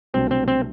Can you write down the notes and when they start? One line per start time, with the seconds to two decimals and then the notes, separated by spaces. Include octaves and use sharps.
0.14 C2 B2 F#3 A3 C4 D4
0.31 C4
0.48 C4